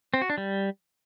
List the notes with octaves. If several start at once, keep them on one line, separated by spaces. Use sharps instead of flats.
C4
F#4
D4
G3